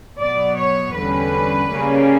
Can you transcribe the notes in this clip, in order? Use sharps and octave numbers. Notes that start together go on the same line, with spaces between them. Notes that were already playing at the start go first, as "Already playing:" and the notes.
B2 F#3 B3 D5
C#5
E2 D3 G3 C#4 B4
C#3 G3 A#3 C#4